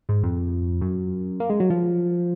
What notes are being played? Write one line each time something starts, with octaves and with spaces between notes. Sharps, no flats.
G#2
F2
F#2
A#3
G#3
F#3
F3